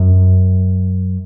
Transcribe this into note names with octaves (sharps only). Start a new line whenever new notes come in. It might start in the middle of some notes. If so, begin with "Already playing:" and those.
Already playing: F#2